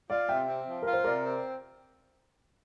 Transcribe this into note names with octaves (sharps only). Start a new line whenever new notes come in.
F4 D5 F5
C3 E5 G5
C4
F3
F4 A#4
C5
C3 A#4 D5
C4